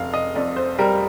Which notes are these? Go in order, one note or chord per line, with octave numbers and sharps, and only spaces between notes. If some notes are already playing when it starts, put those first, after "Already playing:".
Already playing: F1 F5
D#5
F2 D5
C5
G3 A#4